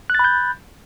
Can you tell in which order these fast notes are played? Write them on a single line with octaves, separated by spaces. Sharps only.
F#6 A6 B5 G6